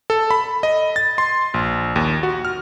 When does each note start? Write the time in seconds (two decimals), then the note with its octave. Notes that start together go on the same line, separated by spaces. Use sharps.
0.10 A4
0.31 B5
0.63 D#5
0.96 A6
1.18 C6
1.54 A#1
1.96 D#2
2.23 F#4
2.45 F6